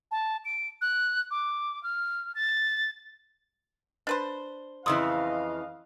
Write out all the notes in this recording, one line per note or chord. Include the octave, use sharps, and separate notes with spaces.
A5
D7
F#6
D6
F6
A6
D4 B4 C5
F2 C#3 E3 D#5 F5 C6 D#6 E6